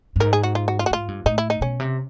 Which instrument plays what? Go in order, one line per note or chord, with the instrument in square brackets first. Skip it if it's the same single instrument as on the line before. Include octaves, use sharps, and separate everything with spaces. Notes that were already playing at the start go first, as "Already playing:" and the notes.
[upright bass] G2
[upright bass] G#2 [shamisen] A#4
[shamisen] G#4
F#4
F4
F#4
F4
F#4
[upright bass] G#2 [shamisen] F4
[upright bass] G2
[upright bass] A2 [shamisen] D#4
[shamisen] E4
D#4
[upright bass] B2 [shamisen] C#4
[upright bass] C3